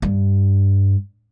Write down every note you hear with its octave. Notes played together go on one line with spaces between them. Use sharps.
G2